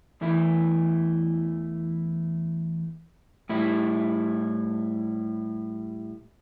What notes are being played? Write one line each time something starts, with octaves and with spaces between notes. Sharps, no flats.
E2 E3 A3 E4
A2 G3 E4